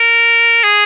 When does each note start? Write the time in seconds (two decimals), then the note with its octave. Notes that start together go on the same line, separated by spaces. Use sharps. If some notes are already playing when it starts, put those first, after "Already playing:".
Already playing: A#4
0.63 G#4